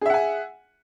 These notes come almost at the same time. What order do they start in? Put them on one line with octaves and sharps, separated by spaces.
G#4 E5 F#5 G#5